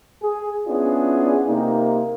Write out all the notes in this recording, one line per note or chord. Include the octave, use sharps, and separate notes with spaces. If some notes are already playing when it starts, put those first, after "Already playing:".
G#4
B3 C#4 D4 E4 F4 G#4
C3 A#3 D#4